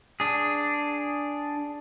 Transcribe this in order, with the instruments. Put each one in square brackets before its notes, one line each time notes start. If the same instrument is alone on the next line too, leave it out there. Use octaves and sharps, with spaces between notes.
[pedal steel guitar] D4 G#4